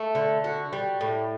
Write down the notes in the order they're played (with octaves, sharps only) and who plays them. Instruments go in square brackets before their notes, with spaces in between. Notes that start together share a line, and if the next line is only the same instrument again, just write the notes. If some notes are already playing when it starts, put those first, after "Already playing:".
Already playing: [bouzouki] A3
D3
F#4
G3
A2